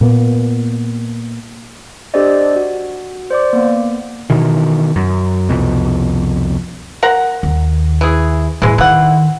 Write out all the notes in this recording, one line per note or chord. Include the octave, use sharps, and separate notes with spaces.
A#2 A#3 B3
D4 G4 A4 C5 D5 D#5
F#4
C5 D5 D6
A#3 B3
B2 D#3 E3
F#2
C2 F2 B2
A#4 F#5 A#5
D#2
E3 G#4
E2 A2 E3 G#3
D#3 E3 F#5